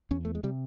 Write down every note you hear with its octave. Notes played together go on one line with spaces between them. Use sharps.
E2 C#4
A3
G#3
C3 G3